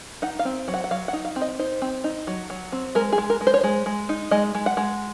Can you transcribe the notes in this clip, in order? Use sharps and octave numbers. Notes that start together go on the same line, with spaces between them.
D#4 F#5
F5
C4
F#3
F#5
F#5
F#3 F5
F#5
D#4
F5
C4
D#5
D#4 C5
C4
D#4
F#3
F#3
C4
G#3 A#4
G#4
G#3
A#4
G#3
C5
C#5
G#3 C5
G#3
D#4
G#3 D#5
G#3
F#5
G#3